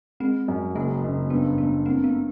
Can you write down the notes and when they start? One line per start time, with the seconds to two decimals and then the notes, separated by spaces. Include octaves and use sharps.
0.20 G#3 C4
0.48 F#2
0.75 F#1 A#3
1.03 F#1
1.30 G2 B3
1.58 G2 B3
1.86 A#3 C4
2.04 B3